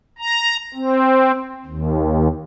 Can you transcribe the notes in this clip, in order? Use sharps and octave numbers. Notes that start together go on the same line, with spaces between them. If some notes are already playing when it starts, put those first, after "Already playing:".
A#5
C4
D#2